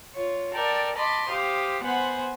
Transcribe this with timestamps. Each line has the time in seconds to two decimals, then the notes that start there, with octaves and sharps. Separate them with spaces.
0.14 F4 C#5
0.54 A4 A#4 D5 G5 A5
0.95 D#5 A5 B5 C6 D6
1.28 G4 C5 F5 D#6
1.82 B3 C5 F#5 G#5 B5